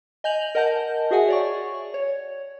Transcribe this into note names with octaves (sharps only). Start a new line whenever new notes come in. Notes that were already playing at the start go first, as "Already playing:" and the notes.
D#5 G#5 G6 F7 F#7
A#4 D#5 F#5 A5 G6
F#4 G#4 E5 F#5 G#5
C#5 D5 C#6
C#5